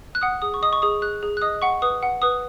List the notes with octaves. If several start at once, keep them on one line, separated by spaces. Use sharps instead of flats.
F#6
F#5 D#6
G#4 D#6
C#6
D#5 D#6
C#6
G#4 D#6
G#4 F#6
G#4
F#6
D#5 D#6
F#5 C#6
B4 D#6
F#5
B4 D#6